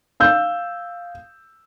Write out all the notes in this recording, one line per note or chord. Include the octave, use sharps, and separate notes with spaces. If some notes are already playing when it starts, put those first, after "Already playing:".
F5 E6 G6